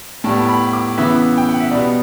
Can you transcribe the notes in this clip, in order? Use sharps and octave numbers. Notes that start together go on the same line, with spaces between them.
A2 G3 B3 A5
A5
B5
D6
C#3 E3 B3 E5
G5
F#5
E5
B2 G3 B3 D5